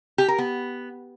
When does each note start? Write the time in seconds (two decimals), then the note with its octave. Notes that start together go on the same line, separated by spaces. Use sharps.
0.18 G4
0.28 A#4
0.38 B3